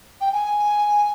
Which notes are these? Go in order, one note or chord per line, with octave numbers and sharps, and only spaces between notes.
G5
G#5